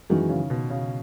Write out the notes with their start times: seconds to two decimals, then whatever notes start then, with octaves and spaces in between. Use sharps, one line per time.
0.10 F#2 D#3 E3 G#3 D#4 F#4
0.29 C#3
0.50 B2
0.70 C#3